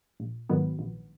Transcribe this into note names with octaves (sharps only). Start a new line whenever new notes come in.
A#1
G#2 D#3 F#3 B3
A#1